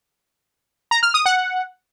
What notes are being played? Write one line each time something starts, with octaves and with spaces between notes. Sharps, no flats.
A#5
F6
D#6
F#5